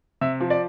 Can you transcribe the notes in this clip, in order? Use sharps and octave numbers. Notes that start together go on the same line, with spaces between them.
C3 E5
F3
D5